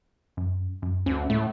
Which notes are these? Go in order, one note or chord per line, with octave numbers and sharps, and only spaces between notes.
F#2
F#2
D2 C#4
A2 A3